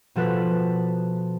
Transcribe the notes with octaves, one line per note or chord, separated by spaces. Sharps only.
B2 F3 A4 B4 F#6 B6